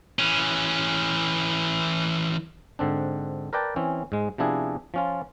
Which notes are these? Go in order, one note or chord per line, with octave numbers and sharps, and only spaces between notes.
E3 C#4
G#2 D3 C4 D4
A#4 B4 D5 G5 A5
E3 C4 C#4
G#2 G#3
C3 F3 B3 D4 E4 G#4
F3 C#4 F4